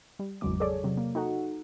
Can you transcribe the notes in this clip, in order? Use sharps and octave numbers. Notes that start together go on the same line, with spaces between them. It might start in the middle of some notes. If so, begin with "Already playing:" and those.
G3
G#1 E2 C#3 F#3 G#3 D6
G#4 A4 C#5 D5
C3 F#3
A#3
D#4 F#4 A4 F#5